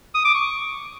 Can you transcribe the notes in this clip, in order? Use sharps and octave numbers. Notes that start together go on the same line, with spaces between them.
D#6
D6
C#6